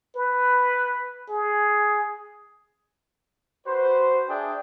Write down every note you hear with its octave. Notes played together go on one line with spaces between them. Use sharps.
B4
G#4
F#4 B4 C5
D4 G#4 D5 E5 G5